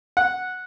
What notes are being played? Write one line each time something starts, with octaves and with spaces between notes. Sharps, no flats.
F#5